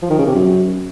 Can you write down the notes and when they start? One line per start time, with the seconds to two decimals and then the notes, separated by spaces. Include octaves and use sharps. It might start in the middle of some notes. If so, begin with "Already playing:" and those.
0.02 F3
0.10 D#3
0.18 C#3
0.27 C3
0.35 F#2